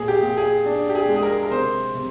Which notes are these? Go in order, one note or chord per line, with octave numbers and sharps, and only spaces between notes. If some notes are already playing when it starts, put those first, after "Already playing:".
Already playing: A#2 G#4
G4
A#2
G#4
D4
G4
G#4
G#3
G#4
A#4
A#4
C3 C5
C3